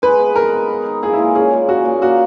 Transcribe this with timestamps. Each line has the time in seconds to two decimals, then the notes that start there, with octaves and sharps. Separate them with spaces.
0.02 G#3 B4
0.19 B3
0.35 D#3 A#4
0.53 B3
0.68 D#4
0.86 D#4
1.02 A#2 G#4
1.13 E4
1.18 G#3
1.35 C#4 G#4
1.53 A#2
1.68 C#4 F#4
1.85 A#2
2.02 A#3 F#4